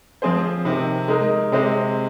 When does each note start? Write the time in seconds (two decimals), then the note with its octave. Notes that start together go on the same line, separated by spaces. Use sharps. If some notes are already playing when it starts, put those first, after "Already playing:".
0.22 F3 C4 G#4 C5
0.65 C3 D#3 C4
1.08 G#3 D#4 A#4
1.52 C3 G#3 C4